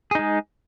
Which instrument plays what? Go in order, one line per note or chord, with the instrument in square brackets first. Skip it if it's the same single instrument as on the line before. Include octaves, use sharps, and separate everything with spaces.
[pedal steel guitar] G#4
D#4
G#3